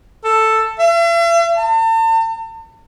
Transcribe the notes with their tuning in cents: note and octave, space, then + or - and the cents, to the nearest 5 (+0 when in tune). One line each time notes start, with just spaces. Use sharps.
A4 +5
E5 +45
A5 +40